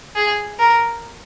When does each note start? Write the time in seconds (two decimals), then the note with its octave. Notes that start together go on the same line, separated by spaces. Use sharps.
0.15 G#4
0.59 A#4